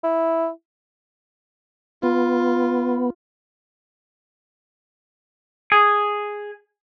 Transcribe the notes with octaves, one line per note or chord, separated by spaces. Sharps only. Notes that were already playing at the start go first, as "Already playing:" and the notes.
E4
B3 F4
G#4